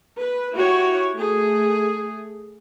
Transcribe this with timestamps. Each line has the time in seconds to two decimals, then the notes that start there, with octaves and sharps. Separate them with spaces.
0.19 B4
0.53 E4 F#4 G4 C#5
1.15 A3 G#4